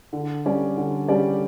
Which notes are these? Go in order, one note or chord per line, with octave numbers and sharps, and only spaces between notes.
D3
G3 C#4 G4 D5
D3
G3 C#4 G4 D5